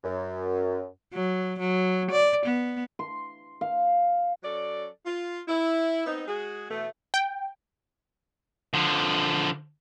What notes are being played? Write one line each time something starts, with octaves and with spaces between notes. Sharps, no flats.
F#2
F#3
F#3
D5
B3
C6
F5
F#3 C#4 A4 D5
F4
E4
B3 C4 D#4
G#3 F#4 G#4
B2 E3 A3
G5
D3 F3